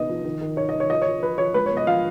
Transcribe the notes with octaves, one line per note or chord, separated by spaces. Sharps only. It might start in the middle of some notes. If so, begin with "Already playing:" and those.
Already playing: B3 D#4 D#5
F3
D#3
D#3
D#4 C#5
D#3 D#5
C#5
F3 D#5
F3 C#5
F3 B4
F3 C#5
G#3 B4
B3 C#5
D#5
F3 F5